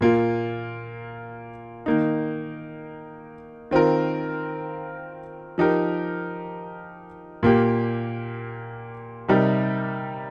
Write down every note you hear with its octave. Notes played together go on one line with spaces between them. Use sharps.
A#2 A#3 F4
D#3 A#3 D#4
D#3 C4 F4 A#4
F3 D#4 G4 A#4
A#2 A#3 G4
C3 G3 D#4 A#4